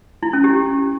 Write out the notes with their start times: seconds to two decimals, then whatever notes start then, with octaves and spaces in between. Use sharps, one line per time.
0.23 E4
0.33 C#4
0.44 G4